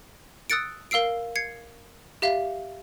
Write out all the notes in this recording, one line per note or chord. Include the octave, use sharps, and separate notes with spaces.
D#6 E6 F#6 A6 C#7 D7
A#4 F5 E6 C7 D7
G#6 C7 C#7
G4 E5 F5